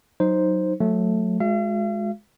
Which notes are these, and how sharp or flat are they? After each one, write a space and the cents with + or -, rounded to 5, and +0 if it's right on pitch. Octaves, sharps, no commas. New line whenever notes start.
F#3 +0 D#4 +0 C5 +0
F#3 -25 A3 +0
G#3 +10 F#4 -40 F5 -45